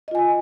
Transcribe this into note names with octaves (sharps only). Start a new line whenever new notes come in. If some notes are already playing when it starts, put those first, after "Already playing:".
F4 D#5 G#5